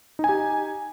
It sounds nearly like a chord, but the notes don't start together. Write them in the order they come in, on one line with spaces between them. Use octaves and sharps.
D#4 G#5 G4